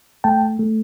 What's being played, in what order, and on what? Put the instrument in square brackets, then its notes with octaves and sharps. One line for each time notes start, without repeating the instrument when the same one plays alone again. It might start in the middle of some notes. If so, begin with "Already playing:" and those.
[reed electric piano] A3 G5 A5
A3